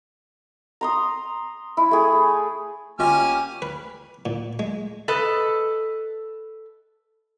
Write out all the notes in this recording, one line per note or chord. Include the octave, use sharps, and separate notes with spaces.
A#5 C6 D#6
E4
A3 G#4
G1 A#3 C#4 F4 G4 D#5 G#5 F6
B4
A#2
G#3
A4 B4 D#5